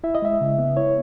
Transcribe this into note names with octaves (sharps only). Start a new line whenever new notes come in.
E4 E5
D#5
G#3 E5
C#3
B3
E4 C#5